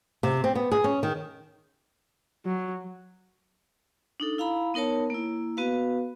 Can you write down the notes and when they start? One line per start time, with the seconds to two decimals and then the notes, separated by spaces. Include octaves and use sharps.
0.23 C3
0.44 C4
0.55 B3
0.71 G#4
0.84 C#4
1.03 D#3
2.46 F#3
4.20 D4 D#4 A4
4.38 E4 F5 A#5 B5
4.74 B3 D#4 A#4 C#5 A5
5.10 A#3 E4
5.57 B3 F#4 B4 F5